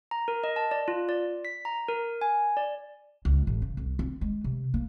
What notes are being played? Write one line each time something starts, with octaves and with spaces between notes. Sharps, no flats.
A#5
A#4
D#5
A5
D5
F4
D5
B6
A#5
A#4
G#5
D5
C#2
A1
C#3
C2
C4
G#3
C3
A#3